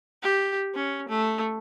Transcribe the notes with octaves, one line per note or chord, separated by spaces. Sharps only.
G4
C#4
A3